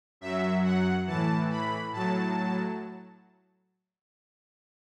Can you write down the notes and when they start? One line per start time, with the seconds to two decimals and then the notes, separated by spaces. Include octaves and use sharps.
0.21 F#2 F#3 E5
0.63 F#5
1.07 A2 E3 A5
1.50 B5
1.92 A2 F#3 A5